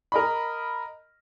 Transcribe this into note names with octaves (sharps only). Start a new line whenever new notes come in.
A#4 D#5 B5